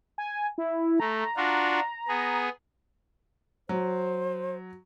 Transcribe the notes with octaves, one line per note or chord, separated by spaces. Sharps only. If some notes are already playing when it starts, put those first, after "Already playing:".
G#5
E4
A3 A#5
D4 F4 F#4
B3 G#4
F#3 C5